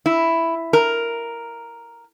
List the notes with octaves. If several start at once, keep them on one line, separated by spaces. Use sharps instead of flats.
E4
A#4